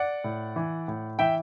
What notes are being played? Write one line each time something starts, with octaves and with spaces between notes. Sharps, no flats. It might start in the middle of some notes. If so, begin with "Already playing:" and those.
Already playing: D5 F#5
A2
E3
A2
E3 E5 G5